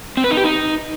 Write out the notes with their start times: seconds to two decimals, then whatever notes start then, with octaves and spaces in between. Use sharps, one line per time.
0.17 C4
0.24 B4
0.31 D#4
0.37 G4
0.44 D#4